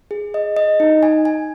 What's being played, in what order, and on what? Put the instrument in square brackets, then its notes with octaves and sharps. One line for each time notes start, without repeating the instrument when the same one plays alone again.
[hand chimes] G#4
D#5
D#5
D#4
G#5
G#5